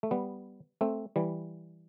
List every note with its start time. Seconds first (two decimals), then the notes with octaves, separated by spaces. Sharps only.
0.03 A3
0.11 G3 B3
0.81 A3 C4
1.16 E3 G3